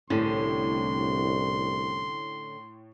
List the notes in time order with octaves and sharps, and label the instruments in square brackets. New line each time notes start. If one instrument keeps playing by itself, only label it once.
[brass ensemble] C2 [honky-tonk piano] A2 [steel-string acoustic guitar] D3 C#4 [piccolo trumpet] C6